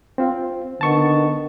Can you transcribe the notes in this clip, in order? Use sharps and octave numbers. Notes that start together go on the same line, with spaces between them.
C4 F4
D3 D#3 B3 A5 C#6